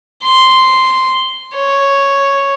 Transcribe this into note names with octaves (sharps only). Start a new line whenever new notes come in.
C6
C#5